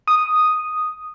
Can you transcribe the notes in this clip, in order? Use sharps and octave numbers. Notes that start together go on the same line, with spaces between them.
D#6